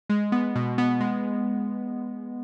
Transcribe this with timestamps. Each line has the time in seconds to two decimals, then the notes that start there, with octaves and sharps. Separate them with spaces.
0.10 G#3
0.32 B3
0.55 B2
0.78 B3
1.00 G#3